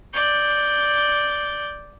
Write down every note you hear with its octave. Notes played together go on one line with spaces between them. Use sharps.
D5 G6